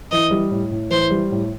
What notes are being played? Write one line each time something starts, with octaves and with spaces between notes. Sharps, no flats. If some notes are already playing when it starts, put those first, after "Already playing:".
E3 D#5
G3
A2
A2
E3 C5
G3
A2